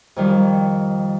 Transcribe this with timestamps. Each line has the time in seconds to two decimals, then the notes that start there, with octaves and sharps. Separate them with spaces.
0.16 F2 D#3 G3